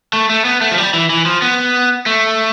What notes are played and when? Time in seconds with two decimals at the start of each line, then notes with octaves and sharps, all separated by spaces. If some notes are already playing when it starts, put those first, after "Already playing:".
0.13 A3
0.29 A3
0.45 B3
0.61 A3
0.71 F3
0.78 G3
0.94 E3
1.10 E3
1.26 F3
1.42 B3
2.06 A3